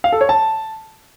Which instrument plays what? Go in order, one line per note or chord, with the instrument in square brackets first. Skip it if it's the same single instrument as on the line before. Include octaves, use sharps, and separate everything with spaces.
[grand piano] F5
A4
C#5
A5